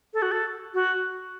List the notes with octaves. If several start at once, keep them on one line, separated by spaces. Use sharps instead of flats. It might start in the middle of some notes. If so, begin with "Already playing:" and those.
A4
F#4
A4
F#4